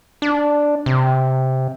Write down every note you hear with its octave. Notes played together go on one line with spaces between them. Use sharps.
D4
C3